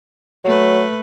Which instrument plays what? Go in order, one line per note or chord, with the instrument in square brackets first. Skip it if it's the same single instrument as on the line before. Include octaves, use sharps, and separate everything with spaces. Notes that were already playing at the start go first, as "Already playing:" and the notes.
[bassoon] F#3 [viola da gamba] A3 B4